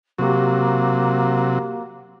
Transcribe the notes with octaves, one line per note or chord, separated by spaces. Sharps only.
C3 F#3 A#3 F#4 G4